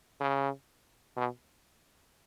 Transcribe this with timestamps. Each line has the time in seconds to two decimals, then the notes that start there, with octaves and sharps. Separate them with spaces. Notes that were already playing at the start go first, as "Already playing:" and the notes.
0.20 C#3
1.17 B2